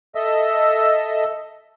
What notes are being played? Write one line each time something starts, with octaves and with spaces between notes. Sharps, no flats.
A4 D#5 E5 E6